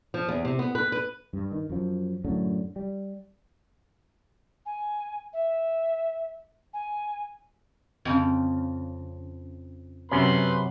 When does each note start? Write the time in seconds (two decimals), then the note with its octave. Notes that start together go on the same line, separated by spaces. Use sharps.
0.14 F3
0.28 E2
0.45 C3
0.59 B3
0.75 B4
0.92 B4
1.33 G2
1.52 D#3
1.70 F#2 F3
2.25 F#2 A2 D3
2.76 G3
4.66 G#5
5.33 E5
6.74 G#5
8.05 F2 C#3
10.11 F#2 C3 C#4 B4 C6